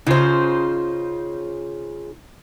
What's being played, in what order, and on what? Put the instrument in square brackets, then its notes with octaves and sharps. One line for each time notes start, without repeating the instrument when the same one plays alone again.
[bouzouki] C#3 C5 [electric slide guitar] D#4 F4